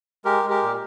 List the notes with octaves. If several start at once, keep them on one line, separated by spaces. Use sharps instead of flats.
G#3 G4 A#4
G#3
G4 A#4
A#2